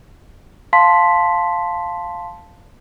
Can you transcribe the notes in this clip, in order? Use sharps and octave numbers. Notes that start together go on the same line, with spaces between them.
F5 A5 C6 B6